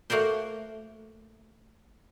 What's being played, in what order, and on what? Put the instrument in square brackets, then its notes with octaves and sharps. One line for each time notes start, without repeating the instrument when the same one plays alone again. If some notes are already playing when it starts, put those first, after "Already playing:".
[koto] A3 A#3 F#4 A#4 C5